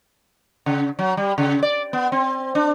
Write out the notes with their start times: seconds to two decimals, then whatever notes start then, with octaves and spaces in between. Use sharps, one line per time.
0.66 C#3
0.99 F#3
1.17 G3
1.38 C#3
1.63 D5
1.93 B3
2.12 C4
2.55 D4